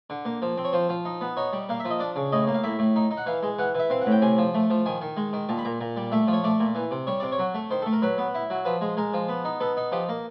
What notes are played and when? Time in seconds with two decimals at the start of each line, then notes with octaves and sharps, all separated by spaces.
0.10 D3
0.25 A#3
0.42 F3
0.57 C4
0.65 C#5
0.73 F3 C5
0.89 F3
1.05 D#4
1.21 B3
1.37 D#4 C#5
1.53 G3
1.69 A#3 F5
1.80 E5
1.85 F3
1.90 D#5
2.00 D4 D5
2.16 C#3
2.32 A2 D#5
2.47 A#3
2.55 F5
2.63 A2 E5
2.79 A2
2.96 D#4
3.11 D#4
3.17 F#5
3.26 E3 F5
3.43 G#3
3.58 E3 F#5
3.75 E3 E5
3.90 C4 F5
4.02 A2 F#5
4.11 G5
4.22 C3 G#5
4.38 F3
4.54 A3
4.70 F3
4.86 D#3 G#5
5.01 D#3
5.17 G#3
5.33 D#3
5.49 A#2 A5
5.58 B5
5.65 A#2 A#5
5.81 A#2
5.97 G3
6.12 A3 E5
6.27 F3
6.33 C#5
6.44 A3 D5
6.60 A#2
6.75 E3
6.91 C3
7.07 G3 C#5
7.20 C3 D5
7.32 C#5
7.39 F#3
7.54 A3
7.71 D#3 C5
7.82 A3 A4
7.93 A#4
8.02 F#3 B4
8.18 B3
8.35 E4
8.50 F#3
8.65 F3 B4
8.81 G#3
8.97 G#3 A#4
9.13 F3
9.28 B3
9.45 D#4
9.60 B3 A4
9.77 D#4
9.92 F3 G4
10.09 A#3